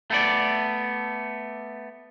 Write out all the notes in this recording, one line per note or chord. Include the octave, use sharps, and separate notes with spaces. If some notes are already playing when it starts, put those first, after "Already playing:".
A3 B3 D5